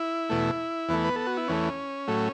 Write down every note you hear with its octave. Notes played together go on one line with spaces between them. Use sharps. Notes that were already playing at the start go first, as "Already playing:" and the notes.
Already playing: E4
E2 B2 A3
E2 E3 A3 B3
B4
A4
F#4
E4
E2 E3 A3 C#4
A2 F#3 A3